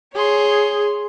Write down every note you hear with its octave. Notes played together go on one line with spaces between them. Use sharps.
G#4 C#5 C6